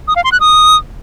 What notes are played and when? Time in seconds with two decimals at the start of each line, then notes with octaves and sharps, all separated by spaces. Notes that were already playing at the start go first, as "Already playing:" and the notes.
0.08 D#6
0.16 F5
0.24 C6
0.32 F#6
0.40 D#6